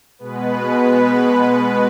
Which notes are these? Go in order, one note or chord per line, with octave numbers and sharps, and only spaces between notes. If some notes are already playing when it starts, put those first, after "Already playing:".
B2 G#3 B3 B4